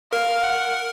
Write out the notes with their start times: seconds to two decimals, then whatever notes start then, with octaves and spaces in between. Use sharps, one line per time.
0.13 A#4 F5
0.43 F#5